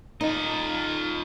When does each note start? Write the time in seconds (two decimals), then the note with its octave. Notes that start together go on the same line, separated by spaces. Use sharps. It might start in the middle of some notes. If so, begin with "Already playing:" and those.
0.21 D#4 F4 D#5